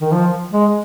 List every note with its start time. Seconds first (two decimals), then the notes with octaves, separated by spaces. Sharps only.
0.01 D#3
0.12 F3
0.53 G#3